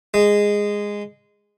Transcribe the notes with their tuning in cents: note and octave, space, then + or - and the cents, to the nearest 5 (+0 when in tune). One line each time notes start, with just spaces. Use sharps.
G#3 -10